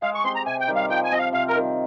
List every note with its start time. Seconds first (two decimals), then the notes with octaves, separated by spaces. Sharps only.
0.02 G#3 F5
0.15 C#6
0.24 C4 G4 C6
0.35 A#5
0.46 C3 G#5
0.60 G5
0.68 D#3 G3
0.76 F5
0.90 F3 G5
1.04 G#5
1.12 C4 F4 D#5
1.19 F5
1.33 C3 F5
1.48 A#4
1.55 D#3 G3